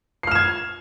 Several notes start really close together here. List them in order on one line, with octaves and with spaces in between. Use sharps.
C7 F6 E7 G#6